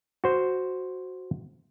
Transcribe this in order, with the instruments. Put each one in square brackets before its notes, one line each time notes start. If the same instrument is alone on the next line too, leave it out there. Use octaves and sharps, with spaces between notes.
[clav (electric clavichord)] F#4 C5